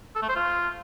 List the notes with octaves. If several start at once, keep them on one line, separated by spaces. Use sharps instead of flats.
A4
A3
C5
F4